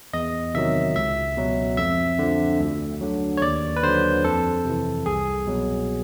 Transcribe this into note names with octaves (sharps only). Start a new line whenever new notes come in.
E2 D#5
C3 D#3 F#3 E5
C#2 E5
B2 F#3
F2 E5
D3 F3
D2
D3 F#3
C#5
D#2 D5
B4
D3 F#3 C5
F2 A4
C3 E3
C2 G#4
B2 F#3